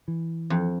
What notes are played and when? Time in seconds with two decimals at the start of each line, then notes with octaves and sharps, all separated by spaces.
0.08 E3
0.50 F2